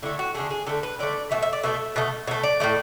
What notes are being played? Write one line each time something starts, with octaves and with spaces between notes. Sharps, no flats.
D3 A3 E4
F#4
D3 A3 G#4
G#4
D3 A3 A4
B4
D3 A3 D5
B2 A3 E5
E5
D5
B2 A3 E5
B2 A3
B2 A3 E5
D5
A2 F#3 A3